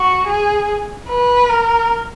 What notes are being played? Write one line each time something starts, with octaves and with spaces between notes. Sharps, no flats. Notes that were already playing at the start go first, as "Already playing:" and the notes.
Already playing: F#4
G#4
B4
A#4